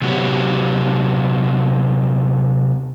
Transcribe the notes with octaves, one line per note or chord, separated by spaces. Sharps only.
C3 F#3 B3 F#4 G4 C#5